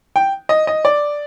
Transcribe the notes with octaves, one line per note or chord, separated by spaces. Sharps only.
G5
D#5
D#5
D5